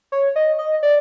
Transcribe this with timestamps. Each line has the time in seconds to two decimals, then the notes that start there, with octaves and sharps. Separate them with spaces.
0.12 C#5
0.36 D#5
0.59 D#5
0.83 D5